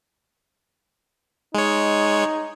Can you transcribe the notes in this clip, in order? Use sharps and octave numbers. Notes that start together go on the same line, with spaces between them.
G#3 D#4 C#5